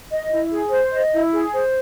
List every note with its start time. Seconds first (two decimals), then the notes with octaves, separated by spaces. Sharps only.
0.10 D#5
0.30 E4
0.50 G#4
0.71 C5
0.91 D#5
1.12 E4
1.32 G#4
1.53 C5